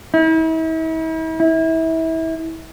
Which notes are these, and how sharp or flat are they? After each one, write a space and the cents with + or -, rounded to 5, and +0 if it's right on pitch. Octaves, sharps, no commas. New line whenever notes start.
E4 -40
E4 -25